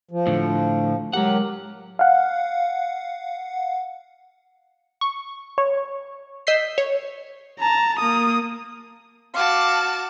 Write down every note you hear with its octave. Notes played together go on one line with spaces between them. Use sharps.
F3
A2 D3
F#3 G#3 G4 A#4 F#5
F5 F#5
C#6
C#5
D#5 E6 G6 B6 C7
C#5
A5 A#5
A#3 D#6
F#4 F5 A5 D6